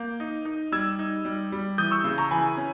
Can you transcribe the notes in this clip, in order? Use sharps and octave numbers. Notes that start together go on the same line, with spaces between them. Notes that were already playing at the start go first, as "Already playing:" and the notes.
Already playing: A#3 G6
D#4
D#4
G3 E6 G#6
D#4
G3
G3
E3 D#6 G6
C#6 E6
C#3
A#5 C#6
E3 G#5 B5
C#4